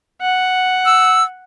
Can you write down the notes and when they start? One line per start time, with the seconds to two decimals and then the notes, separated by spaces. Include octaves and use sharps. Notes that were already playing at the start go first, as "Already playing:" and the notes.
0.21 F#5
0.85 E6